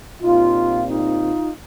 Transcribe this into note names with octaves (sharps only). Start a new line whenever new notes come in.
A#2 G3 C4 D#4 F4
D#4 F4